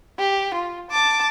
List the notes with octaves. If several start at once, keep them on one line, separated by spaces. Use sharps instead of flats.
G4
F4
A5 D6